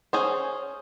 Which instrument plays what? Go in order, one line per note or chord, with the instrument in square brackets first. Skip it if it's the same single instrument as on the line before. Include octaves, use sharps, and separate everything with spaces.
[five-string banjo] C#4 G#4 C5